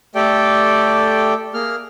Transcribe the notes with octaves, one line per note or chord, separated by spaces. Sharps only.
A3 G4 A4 D5 G5
A#3 G#4 F6